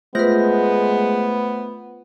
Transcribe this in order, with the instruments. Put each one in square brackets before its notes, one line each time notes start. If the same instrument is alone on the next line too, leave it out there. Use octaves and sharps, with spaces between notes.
[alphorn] G#3 [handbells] A3 C5 A#6 [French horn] B3 [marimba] F4 B4